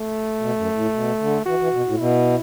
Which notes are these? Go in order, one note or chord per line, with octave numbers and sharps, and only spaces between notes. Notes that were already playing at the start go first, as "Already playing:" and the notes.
Already playing: A3
B2
F#2
A2
B2
D3
E3 F#4
E3
B2
A2
B2 E4